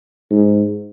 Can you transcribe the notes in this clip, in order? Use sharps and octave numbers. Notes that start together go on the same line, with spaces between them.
G#2